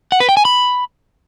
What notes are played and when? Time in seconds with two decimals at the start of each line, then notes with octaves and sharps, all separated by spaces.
0.12 F#5
0.20 B4
0.29 G5
0.37 G#5
0.45 B5